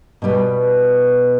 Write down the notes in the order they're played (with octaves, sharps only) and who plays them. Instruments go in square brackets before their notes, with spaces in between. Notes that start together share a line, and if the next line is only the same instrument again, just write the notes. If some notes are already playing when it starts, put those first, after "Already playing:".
[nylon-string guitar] B2 G3 B3